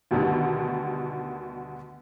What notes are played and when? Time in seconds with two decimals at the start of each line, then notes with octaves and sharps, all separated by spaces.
0.11 D2 B2 D3 D#3 G3